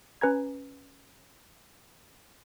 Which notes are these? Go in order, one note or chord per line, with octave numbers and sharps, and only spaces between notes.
C#4 B4 G#5 A#5 G#6